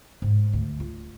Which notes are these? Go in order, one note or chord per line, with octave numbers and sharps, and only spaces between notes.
G#2
D2
F4